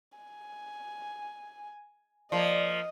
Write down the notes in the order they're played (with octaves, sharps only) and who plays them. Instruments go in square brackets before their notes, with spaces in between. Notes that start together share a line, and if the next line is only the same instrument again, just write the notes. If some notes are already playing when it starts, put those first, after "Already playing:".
[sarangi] G#5
[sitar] F3 A#3 [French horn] D5 [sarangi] D#5